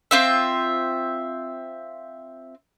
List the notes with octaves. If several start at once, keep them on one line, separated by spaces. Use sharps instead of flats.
C4 F4 E5